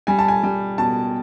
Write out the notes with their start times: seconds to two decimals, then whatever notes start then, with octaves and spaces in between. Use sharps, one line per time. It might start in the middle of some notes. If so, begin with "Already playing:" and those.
0.07 G3 G#5
0.19 A5
0.28 G#5
0.43 G3
0.78 B2 A5